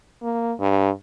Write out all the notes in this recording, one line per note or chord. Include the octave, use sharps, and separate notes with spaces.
A#3
G2